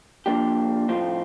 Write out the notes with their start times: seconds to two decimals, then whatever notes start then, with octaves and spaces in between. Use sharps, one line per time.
0.26 F3 A#3 D4 G4
0.88 A2 F3 C4 F4